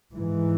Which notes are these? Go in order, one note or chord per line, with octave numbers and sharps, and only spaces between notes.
G#2 E3